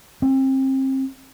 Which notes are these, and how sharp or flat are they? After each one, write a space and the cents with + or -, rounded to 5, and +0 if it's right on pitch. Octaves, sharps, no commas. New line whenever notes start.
C4 +30